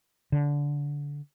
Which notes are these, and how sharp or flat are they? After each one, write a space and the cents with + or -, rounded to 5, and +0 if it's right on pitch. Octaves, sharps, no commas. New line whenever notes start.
D3 -20